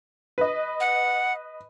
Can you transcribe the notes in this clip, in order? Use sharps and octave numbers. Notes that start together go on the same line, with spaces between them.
B4 D#5
F#5